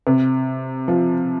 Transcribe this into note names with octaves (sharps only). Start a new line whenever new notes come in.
C3
F3